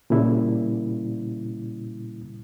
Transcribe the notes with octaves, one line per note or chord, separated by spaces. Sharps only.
A#2 C#3 G3 E4